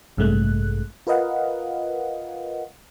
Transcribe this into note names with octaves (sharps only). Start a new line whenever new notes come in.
A1 G2 C3 G#3 A3 F#6
F4 A#4 B4 D#5 F5 F#5